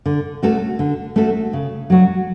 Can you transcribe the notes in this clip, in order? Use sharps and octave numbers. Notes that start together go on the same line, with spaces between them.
D3
A3 C#4 F#4 A4
D3
A3 C#4 F#4 A4
C#3
F#3 A3 D4 F#4